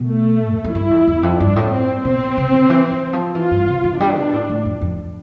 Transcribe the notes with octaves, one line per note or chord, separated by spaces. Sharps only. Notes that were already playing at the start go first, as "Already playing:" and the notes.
Already playing: B2
A3
E2
F2
G2 E4
F2
E2
F2
G2 D4
A2
C4
B2 C4
C3
D3
E3
E3
F3
E3 F4
G2
C3
E3
G3 D4
B2
A2
A2
F2
F2